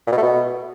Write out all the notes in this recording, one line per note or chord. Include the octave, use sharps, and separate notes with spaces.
A#2
B2
A3
B2